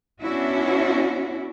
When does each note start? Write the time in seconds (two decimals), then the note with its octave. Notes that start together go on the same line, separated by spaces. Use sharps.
0.21 B3 C#4 D4 E4 F#4